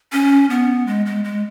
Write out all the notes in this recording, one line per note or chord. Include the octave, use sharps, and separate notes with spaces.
C#4
B3
G#3
G#3
G#3